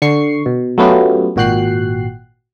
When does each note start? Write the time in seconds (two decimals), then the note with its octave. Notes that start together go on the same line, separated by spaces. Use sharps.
0.02 D3 C#6 C7
0.46 B2
0.78 F#3 A3 B3 C#4 F4 G4
1.36 G#1 A#2 F#4 G5 F#6 C7